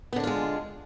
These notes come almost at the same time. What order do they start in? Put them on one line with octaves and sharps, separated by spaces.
B3 D3 D4 F4 G#3